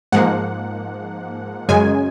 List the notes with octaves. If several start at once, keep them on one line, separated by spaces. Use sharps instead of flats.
G#2 F3 A#3 F#5
F#2 C#3 G#3 G#5